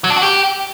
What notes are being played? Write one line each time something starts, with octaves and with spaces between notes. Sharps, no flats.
F#3
D4
F#4
G4